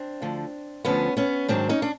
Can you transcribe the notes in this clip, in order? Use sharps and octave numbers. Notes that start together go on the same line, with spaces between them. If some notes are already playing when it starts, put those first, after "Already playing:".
Already playing: C4 D4
D2 D3 F3
D2 D3 F3 B3 C#4
B3 C#4
G#2 D#3 F#3 C4 D4
C#4 D#4
D4